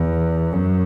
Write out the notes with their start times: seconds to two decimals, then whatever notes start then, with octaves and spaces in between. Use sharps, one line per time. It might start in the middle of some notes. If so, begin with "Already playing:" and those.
Already playing: E2
0.53 F#2